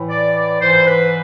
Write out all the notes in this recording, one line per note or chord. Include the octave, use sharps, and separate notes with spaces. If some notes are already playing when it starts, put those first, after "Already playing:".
Already playing: A2 E3
D5
D5
G#2 E3 C5
B4